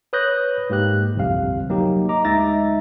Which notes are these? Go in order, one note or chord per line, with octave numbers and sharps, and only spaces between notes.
B4 C#5 D#6 F#6 G6 A#6
G#2 A#3 G4 F#6
G1 C2 F2 C3 F5
F#3 A#3 D#4 G4
D#5 A#5 D6
D2 G#3 D#4 E5 A6 A#6